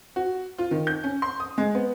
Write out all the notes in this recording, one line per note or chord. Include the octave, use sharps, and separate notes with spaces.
F#4
F4
D#3
G6
C#4
C6
D#6
G#3
B3